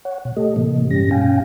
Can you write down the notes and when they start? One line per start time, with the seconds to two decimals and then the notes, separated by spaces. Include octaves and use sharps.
0.05 C#5 F#5
0.25 B2
0.36 A3 G4 A4 D#5
0.56 A2 C3 E3 A#3
0.90 G2 G3 C#4 G4 A#6
1.11 G2 B2 C#4 F5 G5 G#5